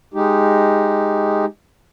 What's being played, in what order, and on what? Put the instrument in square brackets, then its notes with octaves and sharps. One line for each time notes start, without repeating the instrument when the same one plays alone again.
[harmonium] G#3 D#4 G4